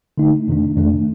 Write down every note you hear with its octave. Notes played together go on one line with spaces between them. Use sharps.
D3 A3 D#4
F2 C3 D#3 A3 D4
F2 C3 D#3 A3 D4